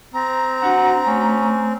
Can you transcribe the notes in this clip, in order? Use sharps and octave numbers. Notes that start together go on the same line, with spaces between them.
C4 A#5
D4 F#4 F#5
A3 C#4